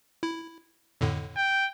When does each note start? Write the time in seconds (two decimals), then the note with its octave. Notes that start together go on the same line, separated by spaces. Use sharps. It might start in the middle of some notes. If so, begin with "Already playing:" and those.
0.23 E4
1.01 F2 A2 D3
1.36 G5